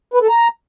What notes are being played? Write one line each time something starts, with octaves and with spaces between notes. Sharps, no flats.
B4
A4
A#5